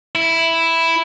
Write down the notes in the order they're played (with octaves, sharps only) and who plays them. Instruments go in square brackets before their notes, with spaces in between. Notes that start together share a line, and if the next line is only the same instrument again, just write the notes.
[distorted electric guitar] E4